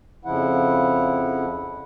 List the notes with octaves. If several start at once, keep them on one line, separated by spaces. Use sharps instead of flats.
F2 C#3 F3 E4 F#5